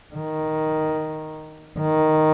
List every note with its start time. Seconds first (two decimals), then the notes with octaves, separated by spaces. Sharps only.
0.15 D#3
1.80 D#3